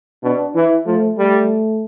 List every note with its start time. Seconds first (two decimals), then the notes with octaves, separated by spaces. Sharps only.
0.23 B2 D4
0.55 E3 E4
0.86 F3 A3
1.18 G3 A3